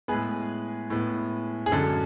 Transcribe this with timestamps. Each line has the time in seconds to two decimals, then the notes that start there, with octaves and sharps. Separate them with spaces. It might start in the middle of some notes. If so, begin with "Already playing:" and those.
0.08 A2 G#3 B3 G#4 B4
0.90 A2 G#3 B3
1.66 G#4
1.72 F#2 D3 G#3 A4